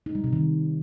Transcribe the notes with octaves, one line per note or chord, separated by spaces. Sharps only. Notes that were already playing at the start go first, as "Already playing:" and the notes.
D#4
G3
C3
D#3